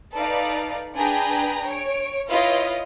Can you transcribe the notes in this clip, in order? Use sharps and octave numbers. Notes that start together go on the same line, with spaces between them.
D#4 A4 B4 D5 F5
D4 G#4 B4 G5 G#5 A#5
C#5 D7
E4 F4 B4 C#5 D#5 F5